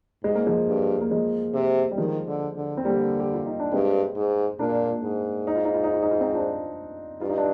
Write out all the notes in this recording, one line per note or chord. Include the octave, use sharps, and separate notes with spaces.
G#2 G#3
A#3
F3 G#3
G2
A#3
F3 G#3
C3
G3
D#3 F3 G#3
D3
D3
C4
D3 G3 A#3
G4
F4
D#4
D4
G2 G#3 C4
G#2
A#2 A#3 D4
G#2
D#4
F4
D#4
F4
D#4
F4
D#4
F4
C4 D#4
D4 F4
G2 F4
D#4
D4